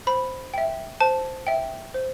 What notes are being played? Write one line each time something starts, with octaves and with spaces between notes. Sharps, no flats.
C5 B5
E5 G5
C5 A5
E5 G5
C5